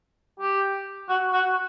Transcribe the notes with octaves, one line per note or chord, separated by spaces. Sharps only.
G4
F#4
F#4